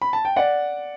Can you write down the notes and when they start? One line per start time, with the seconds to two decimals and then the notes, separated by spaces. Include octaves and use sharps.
0.02 B5
0.13 A5
0.25 G5
0.36 D5 F#5